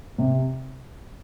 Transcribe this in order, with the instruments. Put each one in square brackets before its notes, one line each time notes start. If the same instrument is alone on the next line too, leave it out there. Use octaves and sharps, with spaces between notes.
[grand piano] C3